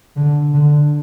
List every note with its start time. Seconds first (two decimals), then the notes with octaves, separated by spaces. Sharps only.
0.16 D3
0.54 D3